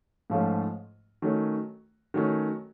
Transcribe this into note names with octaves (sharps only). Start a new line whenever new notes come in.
G#2 F3 A3 C#4 F4
D#3 F#3 A3 C#4
D#3 F#3 A3 C#4